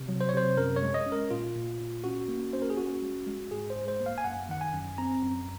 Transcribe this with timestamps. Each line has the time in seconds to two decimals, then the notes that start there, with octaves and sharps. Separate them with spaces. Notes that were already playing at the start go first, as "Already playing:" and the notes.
Already playing: C3
0.08 F#3
0.21 C5
0.29 C#5
0.33 C3 C5
0.57 F#2 A#4
0.76 C#5
0.82 G#3
0.94 D#5
1.06 C#4
1.12 A#4
1.31 A#2 F4
1.55 A#2
1.80 A#2
2.04 C#4 F#4
2.28 A#3
2.53 C#4 C5
2.62 A#4
2.70 G#4
2.77 C#4 F#4
3.02 G#3
3.27 G#3
3.51 G#2 G#4
3.70 C5
3.76 G#2
3.88 C5
4.00 A#3
4.06 F5
4.18 G#5
4.24 F#2 F#5
4.49 D#3 F#5
4.61 G#5
4.73 F#2
4.98 C4 A#5
5.22 F#2